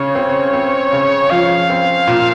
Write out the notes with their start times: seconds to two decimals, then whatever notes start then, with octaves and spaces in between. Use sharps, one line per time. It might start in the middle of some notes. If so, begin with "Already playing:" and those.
Already playing: C#3 C#5
0.15 C4
0.53 C4
0.92 C#3
1.30 F3 F5
1.70 C4
2.08 A#2